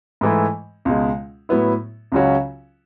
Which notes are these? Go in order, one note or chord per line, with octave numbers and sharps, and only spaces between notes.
G#2 E3 A3 E4
C#2 B2 G#3
A2 F#3 B3 E4
C#2 C#3 F#3 C#4 F#4